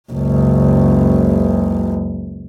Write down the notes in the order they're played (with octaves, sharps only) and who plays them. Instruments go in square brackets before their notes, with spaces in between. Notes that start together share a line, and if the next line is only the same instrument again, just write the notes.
[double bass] F#1 C#2